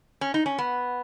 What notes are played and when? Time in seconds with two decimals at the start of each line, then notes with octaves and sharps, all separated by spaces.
0.21 C#4
0.34 D#4
0.46 C#4
0.58 B3